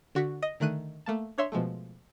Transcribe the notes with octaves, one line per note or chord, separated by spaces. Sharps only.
D3 F#4 C#6 B6
D#5
D3 D#3 A3 F#6 D#7
A3 A#3 A5
D4 C#5 E5 C6
B2 F3 G#3 A3